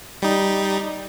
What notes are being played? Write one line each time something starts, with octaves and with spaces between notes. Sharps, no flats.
G3 D#4